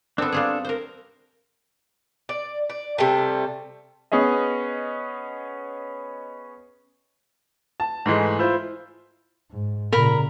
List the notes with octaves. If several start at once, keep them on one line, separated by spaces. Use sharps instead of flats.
B3 C4 D4 A4
G3 F4 G#4
A#4 C5
D5
D5
C3 G3 A3
B3 C#4 G#4 D#5
A5
G#2 E3 G#3 A3
E4 F4 C5
G#2
A#2 C#3 A#4 A#5 B5